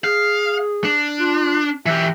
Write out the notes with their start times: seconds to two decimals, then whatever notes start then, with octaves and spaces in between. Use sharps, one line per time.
0.04 G#4 F5
0.84 D4
1.19 F4
1.86 E3 G4 E5